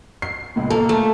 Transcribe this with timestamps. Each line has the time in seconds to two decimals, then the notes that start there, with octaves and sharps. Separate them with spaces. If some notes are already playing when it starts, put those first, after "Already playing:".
0.22 C7
0.56 C#2 A#2
0.70 A#3 A4
0.89 A3